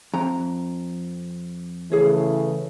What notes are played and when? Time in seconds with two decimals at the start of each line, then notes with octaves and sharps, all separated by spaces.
0.14 F2 A#5
1.92 C#3 E3 A3 G#4 C#5